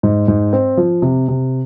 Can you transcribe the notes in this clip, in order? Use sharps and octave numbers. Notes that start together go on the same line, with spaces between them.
G#2
G#2
C4
F3
C3
C3